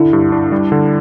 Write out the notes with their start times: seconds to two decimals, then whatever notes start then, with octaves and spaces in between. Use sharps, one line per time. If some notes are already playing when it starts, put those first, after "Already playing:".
Already playing: D3 E4
0.13 G2
0.32 D4
0.52 G3
0.72 D3